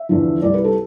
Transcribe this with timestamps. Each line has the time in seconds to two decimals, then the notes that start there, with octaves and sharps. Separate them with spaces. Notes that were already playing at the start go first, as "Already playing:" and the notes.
Already playing: E5
0.09 E2 D3 F3
0.42 C2 C3 G3 D5
0.54 B4
0.64 A4